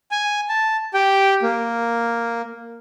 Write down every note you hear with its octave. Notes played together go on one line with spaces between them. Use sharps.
G#5
A5
G4 G5
A#3